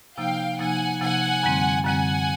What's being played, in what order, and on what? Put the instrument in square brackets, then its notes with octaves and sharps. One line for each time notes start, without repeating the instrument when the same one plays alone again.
[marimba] C3 F3 A#3 D#4 [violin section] F5 G5
[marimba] C3 F3 A#3 D#4 [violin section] F#5 G#5
[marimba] C3 F3 A#3 D#4 [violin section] F#5 G#5
[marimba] F#2 D3 G3 C4
[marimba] F#2 D3 G3 C4 [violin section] F#5 G#5